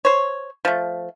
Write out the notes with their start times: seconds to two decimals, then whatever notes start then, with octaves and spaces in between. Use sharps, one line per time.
0.05 C5 C#5
0.65 F3 A3